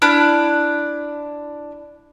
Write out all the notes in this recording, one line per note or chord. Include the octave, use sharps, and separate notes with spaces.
D4 E4 F6